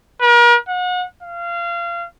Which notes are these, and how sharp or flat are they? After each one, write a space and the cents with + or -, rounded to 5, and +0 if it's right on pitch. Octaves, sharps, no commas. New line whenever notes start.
A#4 +40
F#5 -35
F5 -25